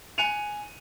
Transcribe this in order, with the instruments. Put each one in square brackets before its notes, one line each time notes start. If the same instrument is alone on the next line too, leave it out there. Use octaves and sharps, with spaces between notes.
[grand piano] G#5 F#6 C#7 D#7 F7